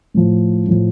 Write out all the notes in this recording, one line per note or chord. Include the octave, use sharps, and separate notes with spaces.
A2 F3
A2 F3